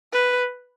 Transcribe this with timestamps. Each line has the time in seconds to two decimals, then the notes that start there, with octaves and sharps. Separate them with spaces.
0.13 B4